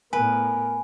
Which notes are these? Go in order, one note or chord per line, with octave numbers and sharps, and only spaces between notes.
A2 B3 A#4 B4 G#5